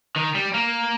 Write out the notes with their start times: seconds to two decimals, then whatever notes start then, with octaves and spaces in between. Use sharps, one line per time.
0.16 D#3
0.35 G3
0.54 A#3